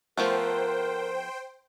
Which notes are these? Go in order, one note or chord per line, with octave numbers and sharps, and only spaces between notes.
F3 A3 B3 A#4 C5 G5